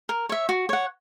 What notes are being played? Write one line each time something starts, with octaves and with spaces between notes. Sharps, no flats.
A#4
C#5 E5
F#4
C#5 F#5